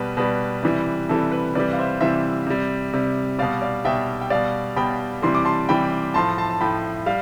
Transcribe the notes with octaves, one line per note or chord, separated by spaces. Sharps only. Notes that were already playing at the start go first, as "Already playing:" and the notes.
Already playing: B2 G3 B4
B2 G3 B4
C3 E3 G3
C3 E3 G3 A4
B4
C3 E3 G3 B4 D5
F5
C5 E5
C3 E3 G3 C5 E5
C3 G3
C3 G3
B2 G3 D5 F5
D5 F5
B2 G3 E5 G5
G5
B2 G3 D5 F5
B2 G3 G5 B5
C3 E3 G3 C6
D6
A5 C6
C3 E3 G3 G5 B5
A2 F3 A5 C6
A5 C6
A5
A2 F3 G5 B5
G3 F5